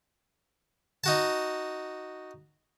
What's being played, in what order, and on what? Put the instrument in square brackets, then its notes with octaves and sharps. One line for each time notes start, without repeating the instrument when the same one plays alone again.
[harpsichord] D#4 F#4 A5